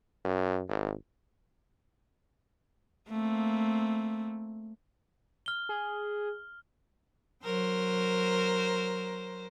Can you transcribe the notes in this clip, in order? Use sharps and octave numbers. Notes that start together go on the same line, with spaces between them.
F#2
G#1
A3 A#3 C4
F6 G7
G#4
F#3 A#4 C5